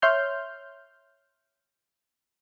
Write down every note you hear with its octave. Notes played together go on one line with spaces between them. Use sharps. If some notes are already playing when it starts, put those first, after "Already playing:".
C#5 E5 C6 F6 G6